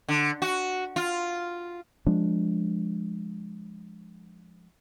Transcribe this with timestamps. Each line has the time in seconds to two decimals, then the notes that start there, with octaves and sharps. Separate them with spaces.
0.08 D3
0.42 F#4
0.96 F4
2.06 F3 G#3 D4